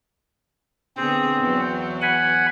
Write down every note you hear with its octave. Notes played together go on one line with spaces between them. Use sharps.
D3 B3 C4 G#4
E2 E3 F#3
F#5 G#5 B5